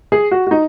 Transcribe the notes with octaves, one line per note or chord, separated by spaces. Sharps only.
G#4
F#4
F#4
D#4